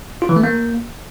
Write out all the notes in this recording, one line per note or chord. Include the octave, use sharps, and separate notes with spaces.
F4
E3
A3
A#3